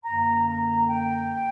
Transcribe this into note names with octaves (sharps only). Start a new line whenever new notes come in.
F#2 D3 A#3 A#5
A#5
G5